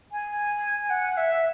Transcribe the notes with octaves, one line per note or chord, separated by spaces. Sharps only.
G#5
F#5
E5